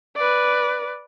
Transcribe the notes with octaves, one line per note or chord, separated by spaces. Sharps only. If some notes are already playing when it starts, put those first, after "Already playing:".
B4 D5